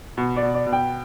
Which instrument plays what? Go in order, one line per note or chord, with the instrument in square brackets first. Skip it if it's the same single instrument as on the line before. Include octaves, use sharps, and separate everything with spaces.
[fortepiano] B2
[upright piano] D5
[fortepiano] B2
[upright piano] D5
[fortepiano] B2
[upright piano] G5